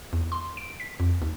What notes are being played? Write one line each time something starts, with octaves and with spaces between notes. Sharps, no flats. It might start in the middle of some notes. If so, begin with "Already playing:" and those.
E2
C6
D7
B6
F2
D#2